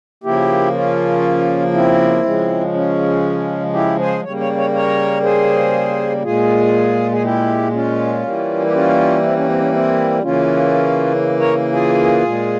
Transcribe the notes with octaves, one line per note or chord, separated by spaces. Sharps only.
C#3 F3 A#3 E4 G4
C#4 F4
C4 E4
C#3 F3 G#3
C#4
E4 G4
G#4 C5
C#3 G3 A#3 C#5
C#5
C#5
A#4 C#5
G#4 C5
A#2 G#3 F4 G#4
G#4
E4 G4
C#4 F4
E3 G3 A#3
G4
C#4 F4
C4 E4
C#4
C4
C#4
C4 E4
C#3 E3 A#3 C#4 F4
A#4 C#5
F4 G#4
A#2 G#3